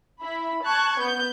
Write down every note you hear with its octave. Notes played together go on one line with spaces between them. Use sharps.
E4 B5
A5 C#6 F#6 G#6
B3 G6